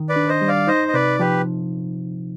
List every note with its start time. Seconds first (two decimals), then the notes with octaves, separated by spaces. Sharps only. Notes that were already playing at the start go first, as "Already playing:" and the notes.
Already playing: D#3
0.09 B4 D5
0.16 D4
0.28 C5 D#5
0.42 G3
0.48 D5 F5
0.68 D#4 C5 D#5
0.88 D#5
0.93 C3 B4 D5
1.19 F3 G4 B4